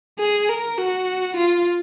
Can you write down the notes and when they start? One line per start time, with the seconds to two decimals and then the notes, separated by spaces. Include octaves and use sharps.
0.19 G#4
0.49 A#4
0.78 F#4
1.37 F4